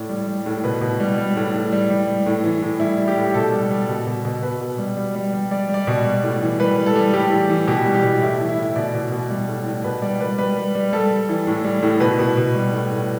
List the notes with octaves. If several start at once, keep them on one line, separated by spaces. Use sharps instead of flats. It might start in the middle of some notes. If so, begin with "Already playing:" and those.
Already playing: A2 D5
G3
G3
A2
B2 B4
B2
G3
G3
A2
A2
G3
G3
G3
A2
E3
A2
G3 E4
G3
G4
A2
B2 A4
G3
G3
B2
B2
B2
B2 B4
B2
G3
G3
G3
G3
G3 D5
G3
D5
B2
G3
A2
E3
G3 B4
G3
A4
G3
A2 G4
E3
E3
B2 G4
G3
G4
B2
A2 E4
E3
E4
A2
B2 D5
B2
B2
G3
A2
A2
B2 B4
G3 D5
G3 B4
G3 B4
G3
G3
G3 A4
G3
E3
A2
G3
A2
B2 B4
B2
B2
G3
A2
A2